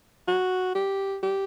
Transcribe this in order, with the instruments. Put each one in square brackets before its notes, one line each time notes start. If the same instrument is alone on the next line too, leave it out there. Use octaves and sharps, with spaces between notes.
[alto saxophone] F#4
G4
G4